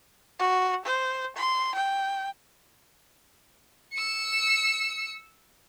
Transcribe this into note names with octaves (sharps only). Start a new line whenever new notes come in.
F#4
C5
C6
G5
E6 C#7